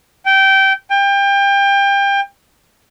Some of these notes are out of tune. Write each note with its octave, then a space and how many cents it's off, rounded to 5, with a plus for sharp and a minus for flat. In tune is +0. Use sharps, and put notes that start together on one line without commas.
G5 -20
G5 +25